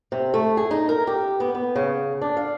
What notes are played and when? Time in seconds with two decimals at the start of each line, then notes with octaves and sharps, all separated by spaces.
0.12 C3
0.34 A3
0.57 G#4
0.71 D#4
0.89 A#4
1.07 G4
1.40 B3
1.55 B3
1.76 C#3
2.22 D4
2.37 F5